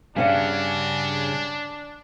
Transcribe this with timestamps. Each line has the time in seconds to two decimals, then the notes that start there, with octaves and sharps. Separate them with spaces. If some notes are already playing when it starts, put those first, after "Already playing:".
0.16 G2 C#3 C#4 D4 F#5